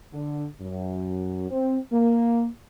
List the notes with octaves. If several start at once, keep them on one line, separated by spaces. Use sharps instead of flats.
D3
F#2
C4
A#3